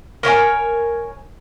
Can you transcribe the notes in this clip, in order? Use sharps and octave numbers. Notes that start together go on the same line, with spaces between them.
A#4 C#5 F5 G#5